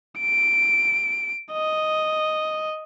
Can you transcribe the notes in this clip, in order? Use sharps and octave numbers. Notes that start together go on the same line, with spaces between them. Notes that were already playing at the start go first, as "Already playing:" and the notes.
D7
D#5